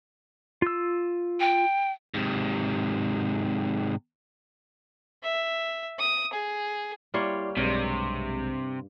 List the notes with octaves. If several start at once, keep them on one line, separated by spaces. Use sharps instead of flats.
F4 E6
G5
G#2 C3
E5
D#6
G#4
G3 A#3 E4 C#5 D5 C6
B1 G2 C3 G#3 C#5